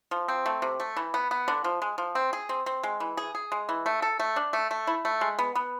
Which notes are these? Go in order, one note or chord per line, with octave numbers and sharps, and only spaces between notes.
F3
C4
A3
C3
A3
E3
B3
B3
D3
F3
G#3
F3
C4
G#4
C4
C4
G#3
E3
G#4
G#4
G#3
E3
A3
A4
A3
D4
A3
A3
E4
A3
G#3
B3
B3